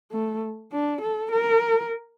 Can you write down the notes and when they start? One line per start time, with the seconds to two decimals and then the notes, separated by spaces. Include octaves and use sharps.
0.12 A3
0.72 D4
1.02 A4
1.31 A#4